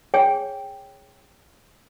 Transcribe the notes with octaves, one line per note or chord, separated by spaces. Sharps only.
G#4 C#5 G5 G#5